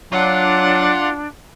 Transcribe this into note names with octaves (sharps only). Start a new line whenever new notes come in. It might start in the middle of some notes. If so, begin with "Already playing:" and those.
F#3 D4 F4 F#5